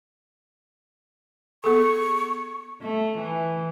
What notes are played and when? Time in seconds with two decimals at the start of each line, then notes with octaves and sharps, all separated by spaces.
1.64 B3 G#4 A4 C#6
2.82 A3
3.18 E3